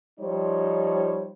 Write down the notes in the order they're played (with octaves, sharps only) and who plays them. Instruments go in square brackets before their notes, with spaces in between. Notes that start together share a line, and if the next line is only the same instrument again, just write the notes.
[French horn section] F3 G3 D#4 C5 C#5